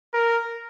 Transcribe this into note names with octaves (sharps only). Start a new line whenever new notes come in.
A#4